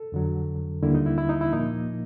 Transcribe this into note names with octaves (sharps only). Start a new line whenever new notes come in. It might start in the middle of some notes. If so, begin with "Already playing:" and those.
Already playing: A4
F2 D3 F#3
D#2 D3 G3 A#3 E4
D#4
E4
E4
D#4
E4
A#2 F3 A#3 D#4